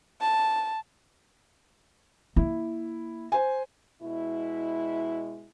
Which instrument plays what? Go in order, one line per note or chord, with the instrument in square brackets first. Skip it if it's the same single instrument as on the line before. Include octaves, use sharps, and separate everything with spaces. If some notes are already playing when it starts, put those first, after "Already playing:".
[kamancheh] A5
[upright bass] A#3 [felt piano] E4
[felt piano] C5 G#5
[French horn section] B2 G#3 E4